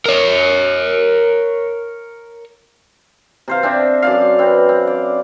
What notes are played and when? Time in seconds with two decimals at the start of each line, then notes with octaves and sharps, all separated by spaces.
0.06 A#4 C#5
3.48 C3 C5 F5
3.63 C4 D4 E5
4.02 F#2 D5 F5
4.39 C4 B4
4.69 C4
4.87 D5